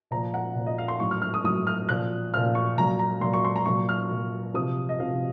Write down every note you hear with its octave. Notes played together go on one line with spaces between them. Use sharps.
A#2 F3 A#5
F#5
A#2 F3
D#5
F5
C6
A2 F#3 C#6
F6
F6
D#6
A2 F#3 D#6
F6
A#2 F3 F#6
A#2 F3 F6
C#6
A#2 F#3 A#5
A#5
A#2 F#3 C6
C#6
C6
A#5
A#2 F#3 C#6
F6
A#2 F#3
C3 F3 D#6
D#5
C3 F3 F5